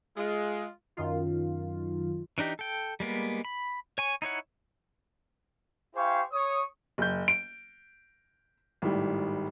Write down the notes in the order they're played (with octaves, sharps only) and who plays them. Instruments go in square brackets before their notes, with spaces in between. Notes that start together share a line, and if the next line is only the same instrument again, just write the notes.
[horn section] G#3 F4
[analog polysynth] F#2 D#3 F4
[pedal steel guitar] E3 D4 D#4 G4
A4 G5
G3 G#3 A#3 B3
B5
C#5 G#5 C#6
D#4 E4 C#5 F#5
[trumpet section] E4 G4 C5 F5 G#5 C#6
C#5 C#6 D#6
[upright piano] F#1 G6
D7
G#1 A2 G3